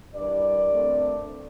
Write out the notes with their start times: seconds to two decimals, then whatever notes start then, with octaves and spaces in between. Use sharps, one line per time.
0.15 G2 E3 G3 A#4 D5
0.71 F2 D3 A3 C4